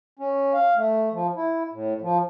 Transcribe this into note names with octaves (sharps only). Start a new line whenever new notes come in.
C#4
F5
A3
F3
E4
A2
F3